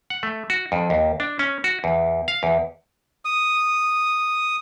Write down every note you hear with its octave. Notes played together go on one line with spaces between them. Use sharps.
F#5
A3
F#4
F2
D#2
D4
C#4
F#4
E2
F5
E2
D#6